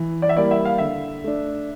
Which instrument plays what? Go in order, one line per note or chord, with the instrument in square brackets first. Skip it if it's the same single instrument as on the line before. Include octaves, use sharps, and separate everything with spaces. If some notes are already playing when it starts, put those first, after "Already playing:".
Already playing: [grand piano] E3
[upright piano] D5
E5
[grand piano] G3 A#3 E4 [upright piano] D5
[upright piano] E5
F5
[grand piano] D3 [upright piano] E5
[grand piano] A3 D4